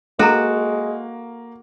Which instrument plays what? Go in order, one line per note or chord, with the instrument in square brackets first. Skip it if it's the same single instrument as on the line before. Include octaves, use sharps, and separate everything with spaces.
[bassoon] G#3 [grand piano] A#3 [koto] F#4 [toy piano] A4 A#5